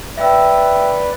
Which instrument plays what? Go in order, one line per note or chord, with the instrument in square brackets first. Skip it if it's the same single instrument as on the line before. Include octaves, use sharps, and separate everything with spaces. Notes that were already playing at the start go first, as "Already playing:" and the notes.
[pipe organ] B4 D5 [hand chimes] E5 G5 E6